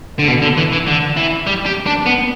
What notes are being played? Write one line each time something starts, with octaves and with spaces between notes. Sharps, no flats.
D3
B2
D3
E3
E3
D3
E3
G3
G4
D4
B3